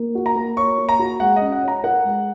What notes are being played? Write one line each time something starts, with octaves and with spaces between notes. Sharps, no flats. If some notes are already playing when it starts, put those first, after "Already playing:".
Already playing: A#3
F#4
A#5
A#3
C#5 C#6
A#3
A#5
F#4
G#3 F#5
C#4 D#5
F#5
C#5 A#5
A#4 F#5
G#3